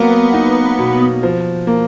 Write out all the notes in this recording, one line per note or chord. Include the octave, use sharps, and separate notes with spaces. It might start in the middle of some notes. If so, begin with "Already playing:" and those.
Already playing: F#3 A#3 B3
D#4
B2
F3
A#3